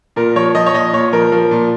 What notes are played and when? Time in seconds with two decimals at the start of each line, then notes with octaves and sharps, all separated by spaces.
0.16 A#2 A#4
0.36 F3 C#5
0.55 F3 D#5
0.66 C#5
0.74 A#2 D#5
0.93 A#2 C#5
1.13 F3 A#4
1.32 F3
1.51 A#2